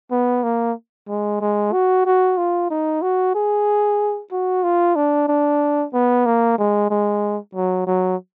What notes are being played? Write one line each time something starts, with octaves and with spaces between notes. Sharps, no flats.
B3
A#3
G#3
G#3
F#4
F#4
F4
D#4
F#4
G#4
F#4
F4
D4
D4
B3
A#3
G#3
G#3
F#3
F#3